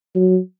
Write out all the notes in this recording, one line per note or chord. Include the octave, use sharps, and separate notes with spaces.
F#3